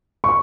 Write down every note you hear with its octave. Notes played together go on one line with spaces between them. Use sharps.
C#6